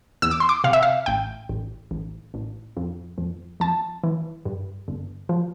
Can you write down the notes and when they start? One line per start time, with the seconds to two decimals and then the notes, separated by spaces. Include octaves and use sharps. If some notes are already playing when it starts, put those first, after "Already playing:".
0.22 E2 E6
0.31 D6
0.40 C6
0.49 D6
0.64 C3 F5
0.73 E5
0.83 F5
1.06 A1 G5
1.49 A1
1.91 A1
2.34 A1
2.77 F2
3.18 F2
3.60 F2 A5
4.04 E3
4.45 G2
4.88 G1
5.29 F3